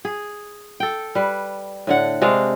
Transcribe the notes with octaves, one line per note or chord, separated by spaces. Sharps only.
G#4
A4 G5
G3 B4
A2 D3 F#5
C3 G#3 D4 F5